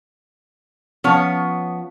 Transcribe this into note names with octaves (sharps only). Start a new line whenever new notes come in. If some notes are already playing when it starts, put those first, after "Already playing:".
F3 B3 C#4 C#5